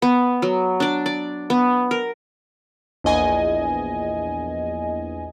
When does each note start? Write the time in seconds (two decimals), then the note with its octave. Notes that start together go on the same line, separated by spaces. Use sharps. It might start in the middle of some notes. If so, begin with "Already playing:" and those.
0.02 B3
0.42 F#3
0.80 D4 D5
1.06 D5
1.50 B3
1.91 A#4
3.04 A#1 E2 D#5 G#5